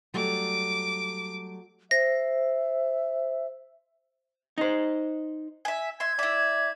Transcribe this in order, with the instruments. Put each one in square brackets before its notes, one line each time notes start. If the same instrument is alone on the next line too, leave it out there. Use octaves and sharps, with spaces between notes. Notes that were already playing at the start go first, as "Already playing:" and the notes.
[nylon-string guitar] F#3 G3 A3 [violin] D6
[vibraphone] C5 [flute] E5 [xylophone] A#6
[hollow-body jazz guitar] D#4 C5
[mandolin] E5 G#5
[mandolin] E5 C6 [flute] G#6
[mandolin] E4 E5 [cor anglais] D5